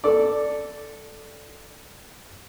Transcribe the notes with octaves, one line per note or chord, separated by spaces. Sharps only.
A4 D5